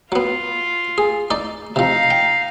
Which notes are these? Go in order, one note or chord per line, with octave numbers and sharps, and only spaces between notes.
F#3 B3 F4
G#4
D#4 D5
C3 F3 D#4 F5
G5